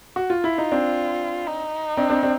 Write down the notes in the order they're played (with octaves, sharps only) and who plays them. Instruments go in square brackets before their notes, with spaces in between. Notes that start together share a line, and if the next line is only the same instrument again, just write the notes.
[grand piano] F#4
F4
[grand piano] E4 [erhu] F4
[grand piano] D#4
C4 D4
[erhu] D#4
[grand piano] C4 D4
C4 D4
C4 D4